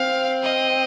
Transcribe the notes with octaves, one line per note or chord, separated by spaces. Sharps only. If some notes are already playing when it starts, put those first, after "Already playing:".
Already playing: C4 F5
D#5